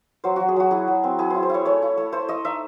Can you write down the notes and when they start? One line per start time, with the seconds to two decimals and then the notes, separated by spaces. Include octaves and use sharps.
0.24 F#3 C5
0.36 F#3 F#4
0.48 G#4
0.56 F#3 F#4
0.71 E4 G#4
0.88 F#3
1.04 C4
1.18 E4 G#4
1.30 E4 C5
1.43 C5
1.50 E4 C#5
1.65 A3 C#5
1.82 E4
1.97 A3
2.12 A3 C5
2.29 A3 D#5
2.45 D#4 E5